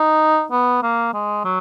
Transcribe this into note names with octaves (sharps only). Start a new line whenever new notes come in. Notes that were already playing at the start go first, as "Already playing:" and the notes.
Already playing: D#4
B3
A#3
G#3
F#3